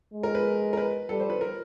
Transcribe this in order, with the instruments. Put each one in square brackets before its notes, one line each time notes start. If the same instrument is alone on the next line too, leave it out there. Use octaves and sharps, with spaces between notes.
[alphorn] G#3
[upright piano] A#4
B4
A#4
B4
[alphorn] G3 [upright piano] A4
[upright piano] C5
B4
A#4